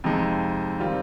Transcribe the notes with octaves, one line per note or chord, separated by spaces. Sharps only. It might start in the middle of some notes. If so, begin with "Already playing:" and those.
F2 C3 F3 G#3 D#4
D#3 G3 C4 F4